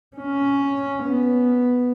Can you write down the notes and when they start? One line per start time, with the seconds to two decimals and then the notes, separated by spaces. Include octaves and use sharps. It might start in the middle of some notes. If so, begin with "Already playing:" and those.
0.16 C#4
1.03 B3